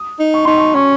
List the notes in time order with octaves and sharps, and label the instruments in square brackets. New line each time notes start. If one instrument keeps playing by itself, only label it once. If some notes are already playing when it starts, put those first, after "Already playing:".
Already playing: [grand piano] D#6
[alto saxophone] D#4
[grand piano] C#6
[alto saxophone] D#4 [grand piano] C6
[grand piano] C#6
[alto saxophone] C#4 [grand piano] C#6